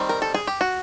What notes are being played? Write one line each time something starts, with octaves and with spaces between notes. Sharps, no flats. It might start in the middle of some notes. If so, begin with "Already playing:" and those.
Already playing: D#3 G3 C4
A#4
A4
G#4
G4
F#4